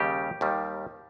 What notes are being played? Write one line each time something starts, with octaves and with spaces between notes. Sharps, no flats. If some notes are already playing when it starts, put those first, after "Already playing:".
Already playing: D#2 C#3 G3 G4
D#2 D#3 G3